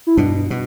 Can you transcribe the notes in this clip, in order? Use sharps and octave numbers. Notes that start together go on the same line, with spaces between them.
E4
G2 B2 D4
B2